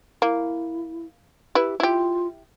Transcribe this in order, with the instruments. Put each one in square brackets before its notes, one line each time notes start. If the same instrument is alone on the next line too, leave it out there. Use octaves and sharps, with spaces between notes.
[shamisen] A#3 [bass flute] E4
[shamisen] E4 B4 [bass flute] G4
[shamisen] E4 G4 [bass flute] F4